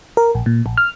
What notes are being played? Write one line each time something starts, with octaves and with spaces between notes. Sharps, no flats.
A#4
A#1
A#2
A#1
F6